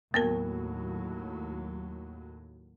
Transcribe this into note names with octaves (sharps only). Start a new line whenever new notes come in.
D#2 A2 F#3 A#3 B3 A#4